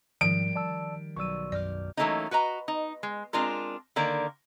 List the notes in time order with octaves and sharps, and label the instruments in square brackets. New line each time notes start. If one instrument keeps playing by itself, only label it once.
[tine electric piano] G#2 [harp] D#3 G3 [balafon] F3 [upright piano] D7
[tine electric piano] D5 A5 E6
[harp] B1 D5 D#7 [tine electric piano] C#6 E6
[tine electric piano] F#2 [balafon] D5 [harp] D6 F6 G6
[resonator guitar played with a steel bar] E3 F#3 A3 A#3 C#4 D#4
F#4 B4 D#5 A#5
D#4
G#3
G#3 C4 D4 F4 A#4
D3 D#3 A#3 D5